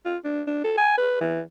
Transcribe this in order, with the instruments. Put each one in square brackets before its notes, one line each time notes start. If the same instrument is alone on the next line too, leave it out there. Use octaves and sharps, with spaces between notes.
[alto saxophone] F4
D4
D4
A4
G#5
B4
E3